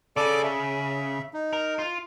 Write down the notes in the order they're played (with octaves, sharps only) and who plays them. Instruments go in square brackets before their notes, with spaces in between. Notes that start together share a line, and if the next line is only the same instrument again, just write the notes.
[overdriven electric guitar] C#3 [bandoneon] A4 D5 D6
[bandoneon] E5
D#4
[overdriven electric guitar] A#4
F4